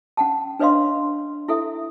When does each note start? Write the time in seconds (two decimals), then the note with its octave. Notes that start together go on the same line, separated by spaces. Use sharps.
0.17 C#4 F#5 A5
0.59 D4 B4 C#5 D#5 F5 C6
1.48 E4 A4 E5